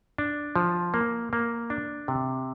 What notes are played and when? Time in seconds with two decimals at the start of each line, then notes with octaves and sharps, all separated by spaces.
0.18 D4
0.56 F3
0.94 A#3
1.33 A#3
1.70 D4
2.08 C3